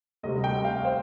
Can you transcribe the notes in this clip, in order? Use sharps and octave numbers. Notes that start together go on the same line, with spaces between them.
D2 C3 G3 D#5
G5
F5
C5